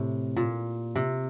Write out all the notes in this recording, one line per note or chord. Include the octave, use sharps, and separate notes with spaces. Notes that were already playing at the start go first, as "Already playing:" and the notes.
Already playing: A2 C3
A#2
C3